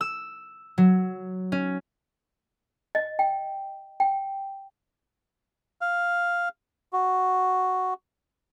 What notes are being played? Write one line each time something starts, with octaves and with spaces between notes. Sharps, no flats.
E6
F#3
C#4
D#5
G5
G5
F5
F#4